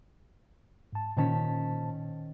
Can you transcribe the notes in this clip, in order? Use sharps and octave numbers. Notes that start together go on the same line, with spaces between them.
G#2 A5
A#2 D#3 C#4 C5 A5 B6